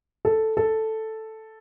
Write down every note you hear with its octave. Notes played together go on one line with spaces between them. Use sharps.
A4
A4